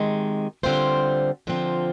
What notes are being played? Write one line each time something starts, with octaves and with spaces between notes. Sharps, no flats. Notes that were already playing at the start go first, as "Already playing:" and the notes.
Already playing: C3 D#3 G#3
D3 G3 C4 F4 C5
D3 F3 C4 F4